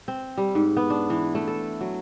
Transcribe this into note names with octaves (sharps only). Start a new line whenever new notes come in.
C4
G3
G#2
B3
D4
E3
A3
A4
F#3